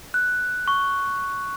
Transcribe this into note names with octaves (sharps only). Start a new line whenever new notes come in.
F#6
C#6